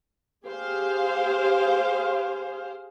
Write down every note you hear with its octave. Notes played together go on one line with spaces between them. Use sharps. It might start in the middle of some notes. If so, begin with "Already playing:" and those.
G4 G#4 C5 F5